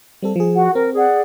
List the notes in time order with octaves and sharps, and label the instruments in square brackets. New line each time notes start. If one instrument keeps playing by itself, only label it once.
[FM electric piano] G3 C4 A4
F3 G#4
[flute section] F#4 F#5
[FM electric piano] C4 [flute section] A#4
[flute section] G#4 D5 F#5